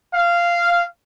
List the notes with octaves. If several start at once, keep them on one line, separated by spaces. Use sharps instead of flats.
F5